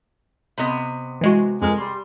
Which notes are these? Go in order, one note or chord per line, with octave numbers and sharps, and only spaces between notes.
C3 B3 D#5 B5
E3 G#3 F#4
F2 G#3 A#4
G3 C6